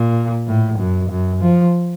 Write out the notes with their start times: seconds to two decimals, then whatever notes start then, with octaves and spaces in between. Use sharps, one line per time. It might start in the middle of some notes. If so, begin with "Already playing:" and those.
Already playing: A#2
0.47 A2
0.79 F#2
1.10 F#2
1.42 F3